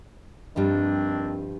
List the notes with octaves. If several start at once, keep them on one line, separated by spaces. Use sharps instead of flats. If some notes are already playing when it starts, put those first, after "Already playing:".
G2 D#3 F3 G3 C4 D4